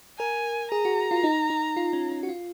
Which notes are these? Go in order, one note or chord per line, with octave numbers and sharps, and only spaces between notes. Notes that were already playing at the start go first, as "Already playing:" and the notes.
A#4 G#5
G#4 A#5
F#4
F4
D#4
D#4
F4
C#4
D#4
F#4
F4